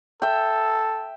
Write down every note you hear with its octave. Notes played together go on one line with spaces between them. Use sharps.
A4 E5 G5